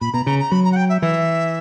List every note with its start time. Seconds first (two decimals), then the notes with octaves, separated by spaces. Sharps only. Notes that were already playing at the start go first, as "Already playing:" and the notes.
0.01 A#2 B5
0.13 B2 A#5
0.26 C#3 A#5
0.39 A#5
0.51 F#3 B5
0.64 A#5
0.72 F#5
0.76 G5
0.89 E5
1.01 E3 E5